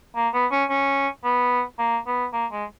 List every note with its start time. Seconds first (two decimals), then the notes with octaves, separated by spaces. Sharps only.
0.16 A#3
0.34 B3
0.52 C#4
0.70 C#4
1.24 B3
1.79 A#3
2.07 B3
2.33 A#3
2.52 G#3